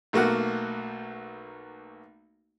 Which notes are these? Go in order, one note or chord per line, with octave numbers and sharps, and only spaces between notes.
B1 A3 A#3 F#4 F#5